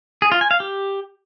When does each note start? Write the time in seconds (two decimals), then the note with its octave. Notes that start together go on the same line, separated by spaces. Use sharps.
0.22 G#4
0.32 F4
0.41 G#5
0.51 F5
0.60 G4